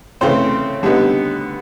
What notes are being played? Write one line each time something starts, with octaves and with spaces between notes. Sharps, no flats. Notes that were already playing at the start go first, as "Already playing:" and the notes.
C#3 E3 A3 C4 C5
D3 G3 B3 D#4